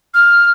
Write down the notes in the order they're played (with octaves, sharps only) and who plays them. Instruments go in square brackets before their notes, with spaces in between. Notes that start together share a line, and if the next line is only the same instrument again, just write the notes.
[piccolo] F6